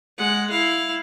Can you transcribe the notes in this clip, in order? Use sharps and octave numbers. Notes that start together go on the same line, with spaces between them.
G#3 F#5
E4 F5